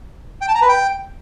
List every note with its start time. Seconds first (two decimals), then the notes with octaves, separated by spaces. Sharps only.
0.41 G5
0.48 A5
0.55 A#5
0.62 B4
0.69 G5